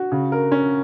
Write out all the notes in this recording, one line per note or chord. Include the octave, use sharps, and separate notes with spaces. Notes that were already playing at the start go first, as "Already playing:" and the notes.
Already playing: F#4
C#3
A#4
C#4